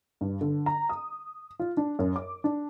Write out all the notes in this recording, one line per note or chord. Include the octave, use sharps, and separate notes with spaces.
G2
D3
A#5
D#6
F4
D4
F#2
D6
D4